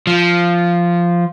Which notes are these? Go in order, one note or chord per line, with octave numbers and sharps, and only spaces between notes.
F3